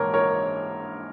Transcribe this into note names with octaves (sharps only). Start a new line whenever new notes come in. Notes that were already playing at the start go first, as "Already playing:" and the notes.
Already playing: A#1 G#2 E3 A#3 A#4 C#5
A#4 C#5